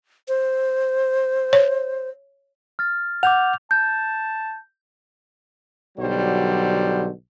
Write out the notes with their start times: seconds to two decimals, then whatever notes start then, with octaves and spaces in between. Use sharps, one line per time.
0.28 C5
1.53 C#5
2.79 F6 A6
3.23 F#5 D6 G6 F7
3.71 A5 G6
5.98 B1 D3 F#3 G3 C5